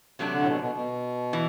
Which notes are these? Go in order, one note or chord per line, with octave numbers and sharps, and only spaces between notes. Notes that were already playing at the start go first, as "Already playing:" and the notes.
C3 F#3 A3 D4
D3
A2
B2
B2
B2
E3